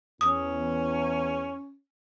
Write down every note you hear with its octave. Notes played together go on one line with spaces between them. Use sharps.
E2 C#4 D#6